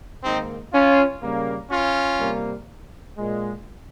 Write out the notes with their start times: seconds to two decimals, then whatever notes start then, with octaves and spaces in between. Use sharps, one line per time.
0.24 G#2 D#3 A#3 C4 D#4
0.73 C#4 F4
1.22 C#3 G3 A#3
1.71 C#4 F4
2.20 C3 G3 A#3
3.18 A#2 G#3